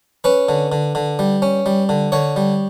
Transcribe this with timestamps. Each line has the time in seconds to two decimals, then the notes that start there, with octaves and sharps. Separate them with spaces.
0.24 C#4 B4
0.49 D3
0.72 D3
0.95 D3
1.19 G3
1.42 C#4
1.66 G3
1.89 D3
2.12 D3 C#5
2.36 G3